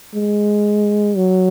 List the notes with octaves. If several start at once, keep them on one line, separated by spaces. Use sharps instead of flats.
G#3
F#3